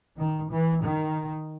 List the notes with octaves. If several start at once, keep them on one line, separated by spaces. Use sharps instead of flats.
D#3
E3
D#3